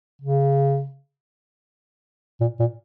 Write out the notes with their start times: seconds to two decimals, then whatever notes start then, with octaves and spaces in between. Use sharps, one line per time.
0.22 C#3
2.40 A#2
2.60 A#2